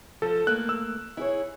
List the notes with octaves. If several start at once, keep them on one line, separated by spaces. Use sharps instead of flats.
F3 A4
A3 A#3 F#6
E6
E4 G#4 C#5